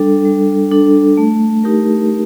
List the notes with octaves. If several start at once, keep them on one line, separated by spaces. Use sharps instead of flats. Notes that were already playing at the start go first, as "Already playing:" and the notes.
Already playing: G3 D4 A4
G3
D4 A4
A3
D#4 G4 A#4
A3